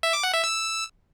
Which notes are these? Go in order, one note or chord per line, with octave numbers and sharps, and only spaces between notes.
E5
D6
F#5
E5
E6